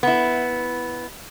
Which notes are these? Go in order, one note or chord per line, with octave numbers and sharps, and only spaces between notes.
B3 E4